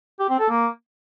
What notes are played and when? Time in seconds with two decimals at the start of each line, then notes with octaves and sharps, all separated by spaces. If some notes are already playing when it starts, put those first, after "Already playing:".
0.19 G4
0.29 C4
0.39 A4
0.50 A#3